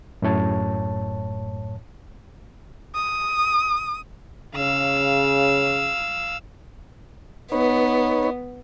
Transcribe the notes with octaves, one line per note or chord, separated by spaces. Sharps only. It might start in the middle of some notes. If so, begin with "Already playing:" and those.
F#2 A2 C#5 A5
D#6
C#3 F5 E6
B3 D#4 B4 C#5